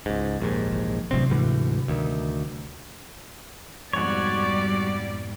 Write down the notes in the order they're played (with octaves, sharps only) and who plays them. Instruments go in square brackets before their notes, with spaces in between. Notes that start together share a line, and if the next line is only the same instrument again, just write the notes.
[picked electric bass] C#2 G#2
A#1 D#2 G#2
[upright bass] E3
[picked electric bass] A1 D2 C4 [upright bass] C3 F#3
[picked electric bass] D2 G#2 E3
D2 D#3
[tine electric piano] F2 G#2 B2 [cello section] G3 [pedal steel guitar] F#4 C#5 [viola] D5